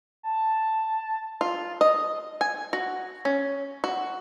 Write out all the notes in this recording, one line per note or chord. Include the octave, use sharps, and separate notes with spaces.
A5
F4
D#5
G#5
F#4
C#4
F#4